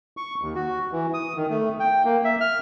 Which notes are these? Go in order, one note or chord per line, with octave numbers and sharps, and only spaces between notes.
C#6
D#2
F#4
E3
D#6
D#3
A3
G5
A#3
E5
F6